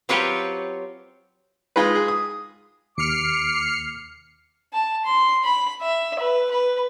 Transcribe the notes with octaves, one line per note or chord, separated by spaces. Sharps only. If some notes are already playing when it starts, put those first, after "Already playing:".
F#3 C4 F4 G4 B4 C#5
G#3 D#4 F4 B4
G#4
D#6
D#2 D6 F6 C7 C#7
A5
C6
B5
E5
B4
B4